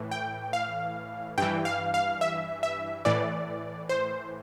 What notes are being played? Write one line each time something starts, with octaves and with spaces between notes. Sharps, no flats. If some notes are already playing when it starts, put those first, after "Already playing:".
Already playing: A2 E3
G5
F5
G2 E3 G5
F5
F5
E5
E5
A2 E3 D5
C5